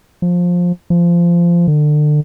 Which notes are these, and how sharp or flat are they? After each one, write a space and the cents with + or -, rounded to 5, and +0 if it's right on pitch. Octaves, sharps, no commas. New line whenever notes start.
F3 +15
F3 -20
D3 +30